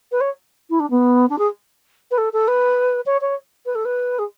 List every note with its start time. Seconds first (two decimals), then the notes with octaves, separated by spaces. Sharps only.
0.11 B4
0.20 C#5
0.70 E4
0.80 D4
0.90 B3
1.29 D4
1.38 G#4
2.11 B4
2.17 A4
2.33 A4
2.47 B4
3.06 C#5
3.21 C#5
3.66 B4
3.75 A4
3.85 B4
4.18 G#4